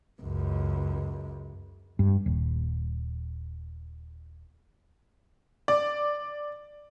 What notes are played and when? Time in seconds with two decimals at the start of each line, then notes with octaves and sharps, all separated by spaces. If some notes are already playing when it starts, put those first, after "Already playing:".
0.22 C#2 F#2
1.99 G2
2.26 D#1
5.68 D5